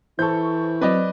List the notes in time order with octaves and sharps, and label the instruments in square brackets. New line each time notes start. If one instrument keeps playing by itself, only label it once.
[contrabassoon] E3 [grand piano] A4 G6 [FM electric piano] C5 C#6
[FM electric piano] F#3 C4 [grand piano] B4 D5 D#5